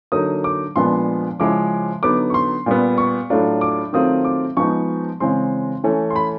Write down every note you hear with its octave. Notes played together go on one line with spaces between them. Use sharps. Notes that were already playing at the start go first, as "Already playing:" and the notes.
D3 F#3 A#3 D#4 D#6
D6
A#2 F3 G#3 B3 D4 C6
C#3 F3 G#3 C#4 E4 D6
D3 F#3 B3 D#4 D6
C#6
C6
A#2 G3 B3
C#6
A2 F#3 A3 D4 F4
D6
D#3 F#3 A3 C4 F4 D#6
D6
F3 G#3 B3 D#4 C#6
C#3 E3 G#3 C4 C6
E3 A3 C#4
C6
B5